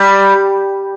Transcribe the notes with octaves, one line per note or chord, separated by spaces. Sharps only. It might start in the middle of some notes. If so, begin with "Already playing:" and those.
Already playing: G3